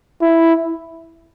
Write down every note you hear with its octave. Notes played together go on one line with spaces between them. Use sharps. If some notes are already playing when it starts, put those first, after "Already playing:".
E4